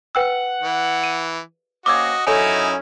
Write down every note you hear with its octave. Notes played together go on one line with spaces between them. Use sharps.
B4 F#5 G5 E6
E3
D#7
A#3 C4 C#4 F#4 D#5 D6 E6 G#6
F#2 C#4 D#4 E4 A4 C#5 G#5